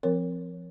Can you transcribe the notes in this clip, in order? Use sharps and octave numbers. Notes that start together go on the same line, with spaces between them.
F3 C4 A#4 C#5